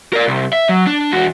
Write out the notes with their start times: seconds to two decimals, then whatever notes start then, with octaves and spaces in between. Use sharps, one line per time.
0.13 A#4 D5
0.27 C2
0.53 E5
0.69 F#3
0.87 D4
1.12 E2 F#4